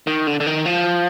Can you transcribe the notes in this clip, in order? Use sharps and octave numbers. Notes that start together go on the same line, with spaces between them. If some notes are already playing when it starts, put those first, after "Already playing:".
D#3
D3
D3
D#3
F3